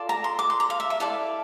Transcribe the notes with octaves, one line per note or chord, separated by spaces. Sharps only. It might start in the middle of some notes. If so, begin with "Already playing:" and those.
Already playing: F4 A4 D5
A#5
C6
D6
C6
A#5
F5
E5
E5
E4 A4 D5 F5